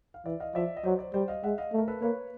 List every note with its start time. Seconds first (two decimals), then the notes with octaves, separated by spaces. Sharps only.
0.14 F5
0.26 E3 D5 E5
0.40 D#5 F5
0.55 F3 D5 E5
0.77 D#5
0.84 F#3 C5 D5
0.99 C5 D5
1.14 G3 C5 D5
1.28 D#5 F5
1.44 G#3 E5 F#5
1.58 D#5 F5
1.72 A3
1.78 A#4
1.88 A4 B4
2.01 A#3 B4 C#5